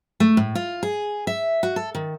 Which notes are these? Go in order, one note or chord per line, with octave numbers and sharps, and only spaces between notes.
A3
A2
F4
G#4
E5
F#4
A4
D#3